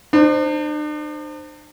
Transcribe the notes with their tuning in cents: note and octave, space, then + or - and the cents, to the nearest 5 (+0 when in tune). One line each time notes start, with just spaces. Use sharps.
D4 +45 C5 +0